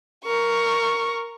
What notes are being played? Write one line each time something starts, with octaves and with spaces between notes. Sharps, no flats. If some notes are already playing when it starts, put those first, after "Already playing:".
A#4 C#6